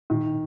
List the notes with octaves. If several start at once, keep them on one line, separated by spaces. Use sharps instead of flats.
A#2 D#3